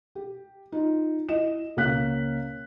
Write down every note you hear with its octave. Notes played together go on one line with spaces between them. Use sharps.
G4
D#4 F4
E4 D#5 E7
C#2 A#3 C#4 F5 F#6 B6